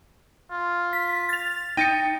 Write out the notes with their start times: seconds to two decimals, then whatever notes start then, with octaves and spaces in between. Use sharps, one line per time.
0.51 F4
0.93 B6
1.29 A6 F7
1.77 D#4 G5 A6 C#7